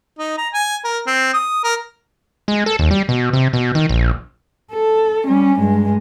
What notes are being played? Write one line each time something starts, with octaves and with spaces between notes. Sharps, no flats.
D#4
A#5
G#5
A#4
C4
D#6
A#4
G#3
A4
D#2
G3
B2
C3
B2
D#3
A#1
A4
G3 C#4
G2 G#3